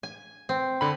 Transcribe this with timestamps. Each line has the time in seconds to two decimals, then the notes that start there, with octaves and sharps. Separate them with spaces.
0.03 G#5
0.49 C4
0.81 D3 B5